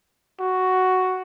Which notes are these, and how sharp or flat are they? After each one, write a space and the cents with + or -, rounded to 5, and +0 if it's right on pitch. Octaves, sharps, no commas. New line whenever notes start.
F#4 +5